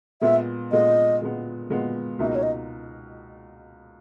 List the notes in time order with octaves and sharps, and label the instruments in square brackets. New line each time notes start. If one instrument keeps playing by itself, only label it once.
[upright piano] A#2 G#3 B3 [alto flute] E5
[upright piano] A#2 G#3 B3 [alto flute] D#5
[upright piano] A#2 G#3 B3
A#2 G#3 B3
[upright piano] C#2 B2 A#3 D#4 [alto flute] E5
[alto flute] D#5
C#5
D#5